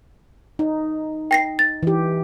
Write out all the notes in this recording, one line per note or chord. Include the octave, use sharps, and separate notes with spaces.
D#4
G5 A#6 C7
A6
E3 G4